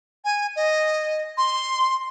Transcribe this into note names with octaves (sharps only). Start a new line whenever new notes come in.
G#5
D#5
C6